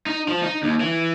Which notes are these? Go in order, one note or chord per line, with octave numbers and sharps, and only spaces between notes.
D#4
F3
D#4
D#2
E3